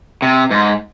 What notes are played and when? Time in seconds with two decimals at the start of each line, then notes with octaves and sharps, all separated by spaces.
0.22 C3
0.51 G#2